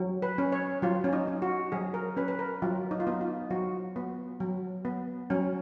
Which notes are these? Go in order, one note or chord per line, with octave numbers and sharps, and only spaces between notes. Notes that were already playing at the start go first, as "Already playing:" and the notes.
Already playing: F#3
B4
C#4
C#5
F#3 F4
C#4
D#4
C#4
F#4
F#3 G#4
A#4
C#4 B4
B4
A#4
F#3 F4
D#4
F4
B3 D#4
F4
F#3 F#4
B3
F#3
B3
F#3 C#4